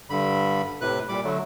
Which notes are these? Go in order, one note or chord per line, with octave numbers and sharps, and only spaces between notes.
G2 D3 B5
A2 C3 B4 F#6
A#2 G3 B5 D6
D3 F#3 A3